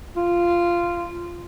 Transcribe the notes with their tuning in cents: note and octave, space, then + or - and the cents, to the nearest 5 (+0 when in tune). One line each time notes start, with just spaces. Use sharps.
F4 -10